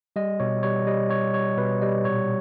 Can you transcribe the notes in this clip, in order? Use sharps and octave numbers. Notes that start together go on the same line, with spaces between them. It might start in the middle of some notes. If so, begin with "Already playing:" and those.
G3 D#5
B2 C#5
G3 C#5
G3 D#5
G3 C#5
G3 C#5
B2 B4
G3 D#5
A#2 C#5